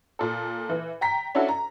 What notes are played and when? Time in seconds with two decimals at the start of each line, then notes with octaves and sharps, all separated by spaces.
0.19 A#2 A4
0.69 E3
1.01 G5 A#5 B6
1.35 C#4 D4 E4 F#4 A4
1.48 A#5